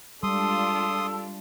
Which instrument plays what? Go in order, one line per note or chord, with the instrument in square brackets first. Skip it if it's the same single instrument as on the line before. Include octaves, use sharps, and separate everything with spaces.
[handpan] G3 [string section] G#3 D4 F4 [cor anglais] A4 [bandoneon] C6 D#6